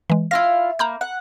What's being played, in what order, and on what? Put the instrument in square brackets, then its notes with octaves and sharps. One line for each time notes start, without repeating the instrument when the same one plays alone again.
[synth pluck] E3 G#3
[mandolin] E4 F4 F5 [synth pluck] A#6
[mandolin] A#3 [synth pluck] A#5 B5 G6
[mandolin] F#5